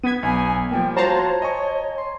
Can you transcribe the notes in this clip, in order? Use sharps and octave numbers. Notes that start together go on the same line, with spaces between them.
B3 G#6 B6 D#7
B1 G#5 B5
F3 G3 A#3 G5
F4 F#4 C5 C#5 A5 A#5
D#5 G#5 C#6
C6